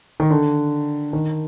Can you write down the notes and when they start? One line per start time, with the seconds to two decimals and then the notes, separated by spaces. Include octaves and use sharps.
0.20 D#3
0.31 D3
1.13 D#3